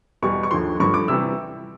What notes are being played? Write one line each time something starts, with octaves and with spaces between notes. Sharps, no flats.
E2 B2 G3 C#6
C#6
D#2 D3 F3 C6
G2 D3 F3 C#6
D6
C3 E3 G3 E6